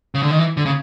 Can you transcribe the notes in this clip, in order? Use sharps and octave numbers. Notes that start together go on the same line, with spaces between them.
C#3
D3
D#3
E3
D3
C#3